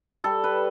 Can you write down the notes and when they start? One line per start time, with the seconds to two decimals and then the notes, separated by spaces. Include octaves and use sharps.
0.24 G3 A4
0.44 B4